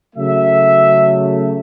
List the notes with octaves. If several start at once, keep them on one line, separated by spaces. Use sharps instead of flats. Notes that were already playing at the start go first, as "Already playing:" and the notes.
C#3 F#3 A3 E5